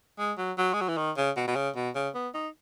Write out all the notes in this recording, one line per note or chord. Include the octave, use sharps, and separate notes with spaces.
G#3
F#3
F#3
G#3
F#3
E3
D#3
C#3
B2
B2
C#3
B2
C#3
B3
D#4